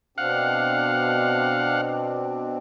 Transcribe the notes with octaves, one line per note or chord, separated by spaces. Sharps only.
B2 C4 D4 F5 F#5